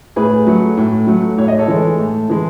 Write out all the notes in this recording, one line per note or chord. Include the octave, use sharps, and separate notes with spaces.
A2 G#4 B4
F#3 A3
A2
F#3 A3
A2 C#5
D#5
A4 C#5
E3 G#3
A2
E3 G#3